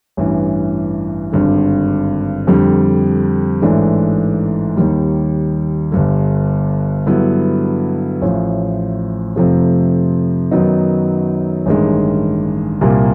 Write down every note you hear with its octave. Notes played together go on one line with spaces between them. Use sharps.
A1 G2 E3
G#1 G2 D3
F2 D3 G3
A1 G#2 E3 A3 D4
D#2 D#3 G3
G1 G2 D3
G2 D3 F#3 B3 E4
A1 A2 F3
F2 C3 F3 A3
F#2 D#3 F#3 B3 D#4
A1 G2 D#3 G#3
C2 A#2 G3 A#3